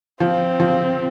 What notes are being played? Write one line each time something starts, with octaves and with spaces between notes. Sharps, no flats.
F3 C4
F3